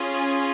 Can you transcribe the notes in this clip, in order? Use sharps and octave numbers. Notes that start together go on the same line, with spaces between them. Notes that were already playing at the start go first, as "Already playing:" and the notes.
Already playing: C#4 F4 G#4